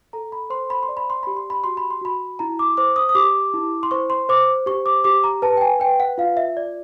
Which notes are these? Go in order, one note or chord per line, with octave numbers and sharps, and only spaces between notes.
A4 A#5
B5
C5 C6
B5
C6
D5
B5
C6
G4 B5
C6
B5
F#4 C6
B5
C6
F#4 B5
E4 A#5
D6
C5 D6
D#6
D#6
G4 D6
E4
C6
C5 C#6
C6
C5 D6
G4 C#6
D6
G4 D6
A#5
B4 A5
G5
G#5
B4 G5
F#5
F4 F5
E5
D5